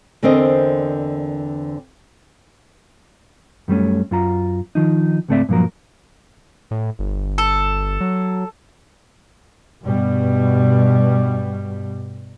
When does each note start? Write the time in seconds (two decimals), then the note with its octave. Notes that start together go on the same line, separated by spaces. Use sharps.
0.23 E2 D3 C4 A#4 C5 D#5
3.68 F#2 G3 A3 C#4
4.11 F#2 F4 A#5
4.75 D#3 F3 D#4
5.28 C#2 G#2 A3 C4 D5 E5
5.49 G2 A#2 F3 F#3 A#4
6.71 A2
6.99 G1
7.38 A4
8.01 F#3
9.83 G2 B2 G3